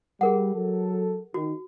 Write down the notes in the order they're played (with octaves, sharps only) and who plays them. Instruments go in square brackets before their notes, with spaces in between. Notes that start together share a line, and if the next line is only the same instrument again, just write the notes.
[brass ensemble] G3 [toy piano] G#4 A#4 F#5
[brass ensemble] F#3 A4
[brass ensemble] D#3 [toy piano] F#4